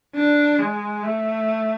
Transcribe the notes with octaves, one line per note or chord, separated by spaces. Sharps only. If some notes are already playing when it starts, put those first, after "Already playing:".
D4
G#3
A3